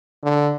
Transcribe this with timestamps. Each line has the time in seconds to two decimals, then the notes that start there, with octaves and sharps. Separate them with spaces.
0.23 D3